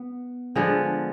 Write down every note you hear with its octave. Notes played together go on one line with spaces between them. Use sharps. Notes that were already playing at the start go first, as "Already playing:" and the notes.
Already playing: B3
D3 F3 G#3 B3